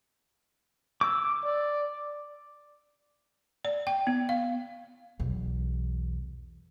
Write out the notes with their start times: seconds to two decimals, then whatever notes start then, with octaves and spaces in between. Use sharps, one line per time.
1.01 D6 E6
1.44 D5
3.65 D5
3.87 G5
4.07 B3
4.29 F5
5.20 B1 E2